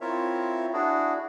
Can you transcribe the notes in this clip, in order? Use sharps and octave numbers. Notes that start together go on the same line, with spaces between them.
C4 E4 F4 A#4 C#5 E5
D4 E4 F#4 G#4